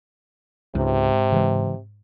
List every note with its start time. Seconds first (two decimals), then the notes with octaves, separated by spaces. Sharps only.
0.75 C#2 G#2 C3
1.32 C#3 E3 G#3